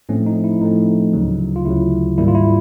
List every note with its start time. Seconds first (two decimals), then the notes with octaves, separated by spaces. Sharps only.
0.09 A2 F3 A3 C4 C#4
0.26 D#4
0.44 E4
0.61 A2 F3 A3 C4 D#4
1.13 D2 C#3 F#3
1.56 F4
1.65 D2 C#3 F#3 E4
2.18 G#2 D#3 G3 A#3 E4
2.28 F4
2.35 E4